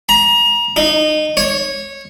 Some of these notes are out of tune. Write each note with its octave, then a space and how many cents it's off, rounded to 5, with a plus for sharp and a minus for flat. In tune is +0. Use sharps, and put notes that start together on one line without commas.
A#5 +30
D#4 -20
C#5 -15